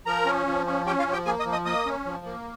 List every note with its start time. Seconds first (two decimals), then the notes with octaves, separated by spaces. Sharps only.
0.06 F3 A#4 A#5
0.26 C#4
0.46 F3
0.66 C#4
0.86 C#4 G4 G5
0.99 F4 F5
1.07 F3
1.13 G4 G5
1.26 A#3 G#4 G#5
1.40 D#5 D#6
1.45 F3
1.52 D#5 D#6
1.65 A#3 D#5 D#6
1.86 C#4
2.06 F3
2.25 A#3